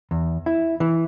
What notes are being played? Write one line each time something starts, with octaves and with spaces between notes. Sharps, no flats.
E2
E4
E3